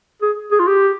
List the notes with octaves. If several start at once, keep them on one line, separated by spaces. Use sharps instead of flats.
G#4
G#4
F4
G4